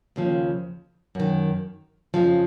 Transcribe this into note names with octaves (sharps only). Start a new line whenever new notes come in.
D#2 C#3 F3
F#2 D#3
F2 C#3 F3